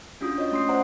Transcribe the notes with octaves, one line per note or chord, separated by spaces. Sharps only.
C#4 D4 F4 F#4 D#6
C#5 D#5
A3 C#4 C6 D#6 C7
C5 D5 F#5 A#5